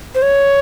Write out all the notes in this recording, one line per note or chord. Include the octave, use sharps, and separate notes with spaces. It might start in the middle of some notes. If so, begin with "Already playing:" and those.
C5
C#5